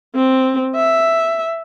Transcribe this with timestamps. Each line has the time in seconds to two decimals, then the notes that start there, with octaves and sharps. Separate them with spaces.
0.15 C4
0.76 E5